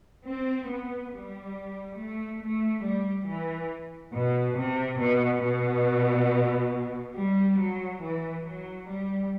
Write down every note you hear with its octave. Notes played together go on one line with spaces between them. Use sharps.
C4
B3
G3
A3
A3
G3
E3
B2
C3
B2
B2
G3
F#3
E3
F#3
G3